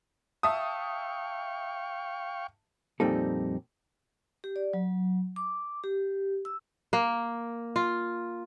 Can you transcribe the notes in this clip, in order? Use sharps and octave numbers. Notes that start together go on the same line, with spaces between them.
E5 F5 G5 A5 C#6 D#6
F2 A#2 G3 C4 D#4 A4
G4
D5
F#3
D6
G4
E6
A#3
F4